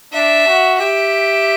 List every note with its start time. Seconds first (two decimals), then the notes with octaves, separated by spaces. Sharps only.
0.13 D4 E5
0.47 F#4
0.79 G4 E5